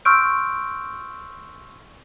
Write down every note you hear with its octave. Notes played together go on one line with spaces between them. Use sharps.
C6 C#6 E6 F6 G6 D7